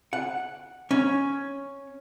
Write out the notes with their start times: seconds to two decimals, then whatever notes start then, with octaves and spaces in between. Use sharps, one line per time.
0.13 F#5
0.91 C#4